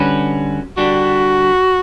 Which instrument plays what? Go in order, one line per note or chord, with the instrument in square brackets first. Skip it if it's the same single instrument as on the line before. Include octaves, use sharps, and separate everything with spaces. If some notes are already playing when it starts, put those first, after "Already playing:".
Already playing: [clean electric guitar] D3 G3 C#4 F#4 B4
[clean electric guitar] D3 G3 D4 [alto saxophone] F#4